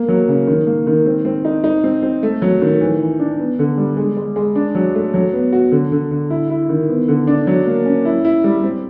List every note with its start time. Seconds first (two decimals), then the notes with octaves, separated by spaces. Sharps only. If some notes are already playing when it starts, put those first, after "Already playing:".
Already playing: A#3
0.08 F#3
0.28 C#3
0.47 D#3
0.67 A#3
0.87 D#3
1.06 C4
1.25 C4
1.45 D#4
1.64 D#4
1.84 C4
2.03 C4
2.23 A3
2.42 F#3
2.62 D#3
2.81 E3
3.01 E3
3.19 D4
3.39 B3
3.59 D3
3.77 G3
3.97 G#3
4.17 G#3
4.36 G#3
4.55 D4
4.75 F#3
4.95 A3
5.14 F#3
5.33 B3
5.52 F#4
5.72 D3
5.92 D3
6.11 D3
6.30 E4
6.50 E4
6.69 D#3
6.89 B3
7.08 D3
7.27 D4
7.47 F#3
7.67 A#3
7.86 C#4
8.05 E4
8.25 E4
8.44 G3
8.64 C4